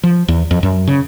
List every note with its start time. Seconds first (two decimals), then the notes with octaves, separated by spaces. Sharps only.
0.03 F3
0.28 E2
0.51 F2
0.63 F#2
0.88 C#3